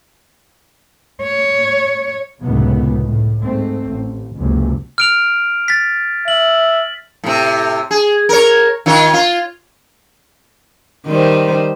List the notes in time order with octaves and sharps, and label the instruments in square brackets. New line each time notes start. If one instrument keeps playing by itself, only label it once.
[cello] C#5
[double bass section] C#2 F#2 A2 C3 D#3 B3
A2
G#2 A3 C4
A1
F#1 C#2 F#2 C3
[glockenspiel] F6 D7 F7
A6 B6
[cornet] E5 [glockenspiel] F#7
[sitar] A2 C3
G#4
A#4 C#5
D#3 F4 C#5
F4
[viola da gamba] D#3 G3 C5